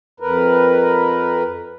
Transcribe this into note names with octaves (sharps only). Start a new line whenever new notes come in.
F2 A#4 B4